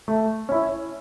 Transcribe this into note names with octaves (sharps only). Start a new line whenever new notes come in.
A3
C#4 E4